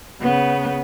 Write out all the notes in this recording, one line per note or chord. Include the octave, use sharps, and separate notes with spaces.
C#3 B3